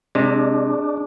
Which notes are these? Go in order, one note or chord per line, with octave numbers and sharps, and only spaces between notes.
C3 G#3 D4 G#4 D#5